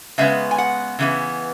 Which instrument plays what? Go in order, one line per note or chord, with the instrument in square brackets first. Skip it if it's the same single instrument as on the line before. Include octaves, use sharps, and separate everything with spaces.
[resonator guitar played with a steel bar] C#3 G#3 B3 E5
G#5
F#5
C#3 E3 B3